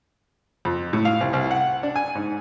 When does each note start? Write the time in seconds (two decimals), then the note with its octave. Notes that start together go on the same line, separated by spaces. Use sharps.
0.65 F2
0.93 A2
1.05 F5
1.21 C2
1.33 C2
1.51 F#5
1.83 D4
1.96 G#5
2.15 G#2